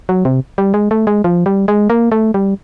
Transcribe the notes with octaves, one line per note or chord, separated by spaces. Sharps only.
F#3
C3
G3
G#3
A3
G#3
F3
G3
G#3
A#3
A3
G3